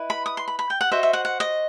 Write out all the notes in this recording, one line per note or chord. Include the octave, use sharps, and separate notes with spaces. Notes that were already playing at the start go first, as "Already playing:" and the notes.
Already playing: E4 B4 D#5
B5
D#6
C6
B5
B5
G5
F#5
F#4 C5 D#5 E5
E5
F#5
F#5
D#5